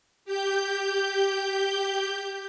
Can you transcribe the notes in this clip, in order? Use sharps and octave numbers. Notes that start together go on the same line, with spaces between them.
G4 G6